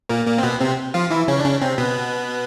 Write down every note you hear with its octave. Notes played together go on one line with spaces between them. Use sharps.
A#2 A#3
A#2 A#3
C4
B2 B3
C3 C4
F3 F4
E3 E4
C#3 C#4
D4
C#3 C#4
C3 C4
B2 B3